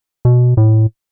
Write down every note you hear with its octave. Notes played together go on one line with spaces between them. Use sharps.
B2
A2